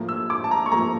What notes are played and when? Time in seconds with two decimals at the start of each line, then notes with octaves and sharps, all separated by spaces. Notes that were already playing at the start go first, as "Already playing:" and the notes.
Already playing: A2 F3 A#3
0.09 E6
0.30 D6
0.44 A5
0.51 A#5
0.66 C#6
0.72 A2 F3 A#3 A#5